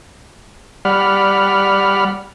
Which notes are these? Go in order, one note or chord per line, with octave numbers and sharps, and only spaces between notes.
G3 D5 F#5 B5 F6